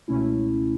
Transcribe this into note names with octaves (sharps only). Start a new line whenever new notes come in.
C#2 B2 A3 C#4 E4